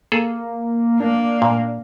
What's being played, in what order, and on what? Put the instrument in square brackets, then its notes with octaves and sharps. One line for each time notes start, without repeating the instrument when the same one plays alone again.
[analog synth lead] A#3 [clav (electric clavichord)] G#4 A4
[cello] A#3 [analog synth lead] D4
[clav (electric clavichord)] A#2